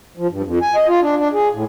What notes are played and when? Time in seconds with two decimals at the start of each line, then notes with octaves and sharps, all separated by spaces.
0.17 F3
0.29 G2
0.44 F2
0.62 G#5
0.76 D#5
0.88 F4
1.02 D4
1.17 D4
1.33 G#4
1.52 A2